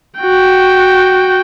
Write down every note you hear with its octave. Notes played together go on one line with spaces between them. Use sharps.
F#4 G5